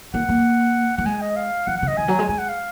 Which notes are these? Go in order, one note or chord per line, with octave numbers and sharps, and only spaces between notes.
A#3 F#5
A#3
A#3 F#5
G#3 G#5
D#5
F5
F3 F#5
F#5
C#3
D#5
D#3 G#5
F#3
G#3
G#3 G#5
F#5
F5